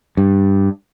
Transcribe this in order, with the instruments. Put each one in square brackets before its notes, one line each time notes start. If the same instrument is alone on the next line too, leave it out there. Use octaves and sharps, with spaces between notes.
[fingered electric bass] G2